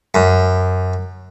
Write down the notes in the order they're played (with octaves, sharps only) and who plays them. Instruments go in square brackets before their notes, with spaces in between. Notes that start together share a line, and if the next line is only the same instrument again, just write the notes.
[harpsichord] F#2